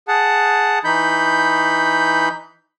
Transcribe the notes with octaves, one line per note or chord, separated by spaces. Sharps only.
G#4 F#5 A5
E3 D#4 B5 G6